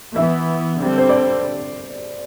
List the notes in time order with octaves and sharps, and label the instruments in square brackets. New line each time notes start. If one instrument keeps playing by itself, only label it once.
[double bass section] E3 B3 [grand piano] E5
[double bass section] D3 G3 C4
[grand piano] C5
D5